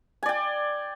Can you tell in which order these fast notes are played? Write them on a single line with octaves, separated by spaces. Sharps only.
G#5 D5 G5